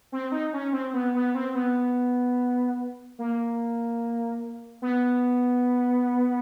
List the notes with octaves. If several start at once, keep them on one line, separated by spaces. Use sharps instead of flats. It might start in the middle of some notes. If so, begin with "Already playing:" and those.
C4
D#4
C#4
C4
B3
B3
C4
B3
A#3
B3